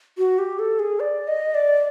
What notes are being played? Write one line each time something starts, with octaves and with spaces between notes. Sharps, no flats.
F#4
G4
A4
G#4
D5
D#5
D5